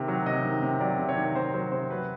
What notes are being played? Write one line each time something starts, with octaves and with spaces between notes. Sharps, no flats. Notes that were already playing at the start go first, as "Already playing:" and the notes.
Already playing: C3 D#3
F#3
C3 D#5
D#3
C3
F#3 D5
C3
C#5
D#3
C3 C5
F#3 C5
C3 C5
F#3 B4